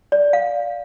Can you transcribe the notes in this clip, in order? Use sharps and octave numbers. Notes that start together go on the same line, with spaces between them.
D5
F5